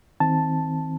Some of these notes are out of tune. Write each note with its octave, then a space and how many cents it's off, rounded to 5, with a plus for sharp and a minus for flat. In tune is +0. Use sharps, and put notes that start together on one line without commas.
D#3 +30 C4 +0 A5 +0